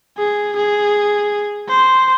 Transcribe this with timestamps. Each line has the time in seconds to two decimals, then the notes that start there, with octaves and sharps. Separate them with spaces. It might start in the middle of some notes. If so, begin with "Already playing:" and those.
0.18 G#4
0.56 G#4
1.69 C5